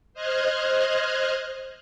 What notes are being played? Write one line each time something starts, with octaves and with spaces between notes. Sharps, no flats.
C5 D#5 F6 F#6 G#6